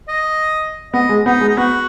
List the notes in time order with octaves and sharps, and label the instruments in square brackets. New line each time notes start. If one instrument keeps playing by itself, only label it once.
[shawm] D#5
[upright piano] B3 [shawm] D#5
[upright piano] G#3
[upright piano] B3 [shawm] D#4
[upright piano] G#3
[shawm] D#4
[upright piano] B3 [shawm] F#4